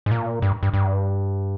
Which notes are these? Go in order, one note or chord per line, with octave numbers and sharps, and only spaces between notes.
G#2
A#2
G2
G2
G2